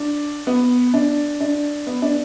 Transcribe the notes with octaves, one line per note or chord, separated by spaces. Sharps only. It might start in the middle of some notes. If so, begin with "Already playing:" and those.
Already playing: D4
B3
D4
D4
B3
D4